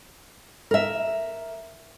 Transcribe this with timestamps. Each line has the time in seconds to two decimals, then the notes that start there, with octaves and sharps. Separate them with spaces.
0.71 A#4 E5